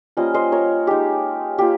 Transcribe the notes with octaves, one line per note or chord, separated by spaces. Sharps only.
G3 A#3 C#4 F4 C5 D#5
C5 D#5
A#4 C#5
G#3 D#4 G4
A#3 F4 G4